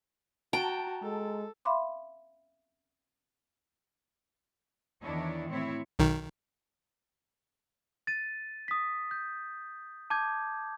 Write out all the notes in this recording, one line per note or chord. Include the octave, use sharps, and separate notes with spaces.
F#4 G5 A5 A#5
G#3 A4
E5 F5 B5 C6 D6
E2 D#3 E3 D4 E4 C#5
A2 C4 E4 C#5
B1 D#3
A6 D#7
D#6 B6
G6
A5 D6 G6 G#6